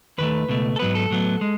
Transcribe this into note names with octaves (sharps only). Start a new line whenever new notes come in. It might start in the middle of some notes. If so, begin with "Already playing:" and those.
D#2 D#3 A3 B4
C#2 B2 A3
A4
G#2 F#3 B3 B4
A4
A2 F#3 B3
G#3